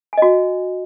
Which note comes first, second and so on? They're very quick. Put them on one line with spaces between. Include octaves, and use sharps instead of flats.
G#5 D#5 F#4